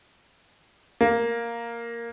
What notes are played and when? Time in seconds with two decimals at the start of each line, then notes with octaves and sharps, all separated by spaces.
1.01 A#3